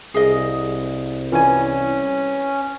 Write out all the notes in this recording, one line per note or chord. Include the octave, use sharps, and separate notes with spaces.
C2 G#4 A#4 D#5
E3 C#4 G#5